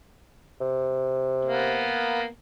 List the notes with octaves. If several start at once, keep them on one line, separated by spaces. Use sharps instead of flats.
C3
A#3 B3